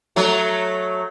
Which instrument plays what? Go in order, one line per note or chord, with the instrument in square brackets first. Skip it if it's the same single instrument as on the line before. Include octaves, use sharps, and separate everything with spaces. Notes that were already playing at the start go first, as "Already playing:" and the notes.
[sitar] F#3 A3